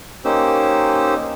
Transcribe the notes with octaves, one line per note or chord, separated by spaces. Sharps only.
A#3 C#4 D#4 G4 C5 E6